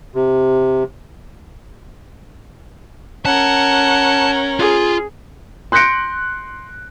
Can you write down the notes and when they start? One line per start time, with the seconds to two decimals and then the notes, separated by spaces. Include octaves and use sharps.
0.15 C3
3.25 C#4 A#4 F#5 A5
4.60 F4 G#4
5.72 C6 F#6 G6 A#6 C#7 D7